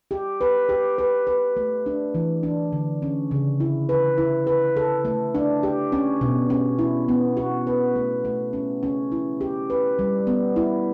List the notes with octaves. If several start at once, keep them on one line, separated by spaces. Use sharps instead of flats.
G4
B4
G4
B4
B4
A3
D4
E3
D4
D3
C#4
C#3
E4
B4
E4
B4
A4
A3
D4
G4
C#4
B2
C#4
E4
B3
F#4
B4
A3
A3
C#4
C#4
E4
G4
B4
G3
B3
E4